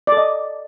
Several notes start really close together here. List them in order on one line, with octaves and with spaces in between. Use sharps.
D5 A4 D#5